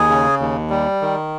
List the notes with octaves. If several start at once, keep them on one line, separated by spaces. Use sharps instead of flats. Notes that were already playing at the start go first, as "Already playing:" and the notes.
Already playing: D#2 G#4
C#3
D#2
G3
D#3